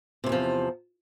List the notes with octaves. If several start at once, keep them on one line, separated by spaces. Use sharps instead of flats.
E2 A2 C3 F3